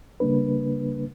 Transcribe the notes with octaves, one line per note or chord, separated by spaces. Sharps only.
C#3 G3 A#3 D4 B4